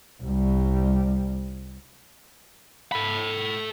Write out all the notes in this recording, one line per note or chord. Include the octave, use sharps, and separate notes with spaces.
C2 G3
A4 B5